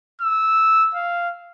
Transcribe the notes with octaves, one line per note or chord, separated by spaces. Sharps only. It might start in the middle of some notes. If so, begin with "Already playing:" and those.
E6
F5